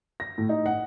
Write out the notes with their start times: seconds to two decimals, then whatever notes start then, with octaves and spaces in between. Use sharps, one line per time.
0.20 A#6
0.38 A2
0.49 D#4
0.66 F#5